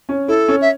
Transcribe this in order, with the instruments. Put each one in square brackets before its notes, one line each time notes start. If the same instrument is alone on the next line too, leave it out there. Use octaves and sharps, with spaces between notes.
[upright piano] C#4
[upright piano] E4 [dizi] A4
[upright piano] C#4
[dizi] E5